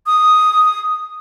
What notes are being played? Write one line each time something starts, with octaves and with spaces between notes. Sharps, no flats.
D#6